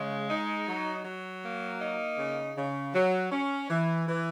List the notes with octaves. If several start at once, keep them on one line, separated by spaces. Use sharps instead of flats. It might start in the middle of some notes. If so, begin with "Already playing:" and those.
Already playing: C#3 G#3
D#4
F#3
F#3
A#3
D#4
C#3
C#3
F#3
C#4
E3
E3